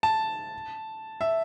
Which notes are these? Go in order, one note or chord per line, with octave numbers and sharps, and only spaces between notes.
A5
E5